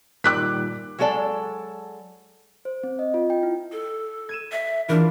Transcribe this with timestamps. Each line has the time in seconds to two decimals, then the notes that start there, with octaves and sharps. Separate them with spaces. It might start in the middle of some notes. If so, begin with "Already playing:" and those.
0.24 A#2 D#3 G3 D6 F#6 B6
0.99 F#3 G#3 F4 A4 D5 A5
2.65 C5
2.83 C4
2.99 D#5
3.14 F4
3.30 G5
3.43 E4
3.72 A4
4.29 G#6 D#7 E7
4.52 E5
4.89 E3 D4 F4 A#4